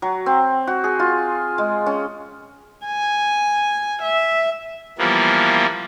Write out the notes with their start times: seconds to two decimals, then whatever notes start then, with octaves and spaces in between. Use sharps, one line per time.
0.02 F#3
0.26 C4
0.67 F#4
0.84 G#4
0.99 F4
1.58 G#3
1.86 C#4
2.86 G#5
4.02 E5
4.99 E3 F3 G3 A#3 B3